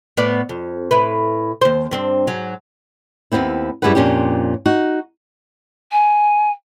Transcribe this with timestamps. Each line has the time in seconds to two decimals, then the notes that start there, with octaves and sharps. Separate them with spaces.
0.17 A2 B3 D5
0.49 F2
0.91 A2 E4 B4
1.61 D#2 C5
1.91 G2 C4 D4
2.27 G#2 F#3
3.32 D#2 G#2 B3 C4 E4
3.82 F#2 G3 E4 G#4 B4 F#5
3.95 F2 A#2 C#4 D4 G4
4.66 D#4 F#4
5.92 G#5